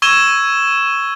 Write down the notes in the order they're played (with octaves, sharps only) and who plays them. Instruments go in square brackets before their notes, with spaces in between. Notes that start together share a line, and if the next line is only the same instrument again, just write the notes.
[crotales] C#6 E6 G#6 D#7 E7 G7